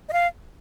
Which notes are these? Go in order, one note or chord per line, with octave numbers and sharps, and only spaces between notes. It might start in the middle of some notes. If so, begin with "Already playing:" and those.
D#5
F5